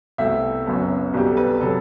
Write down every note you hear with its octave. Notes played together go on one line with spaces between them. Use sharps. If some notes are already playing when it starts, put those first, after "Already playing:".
C2 B2 A3 C4 E5
F#1 F#2 F#3 B3
B1 B2 G3 C4 G4
A4
B4
C3 F#3 A4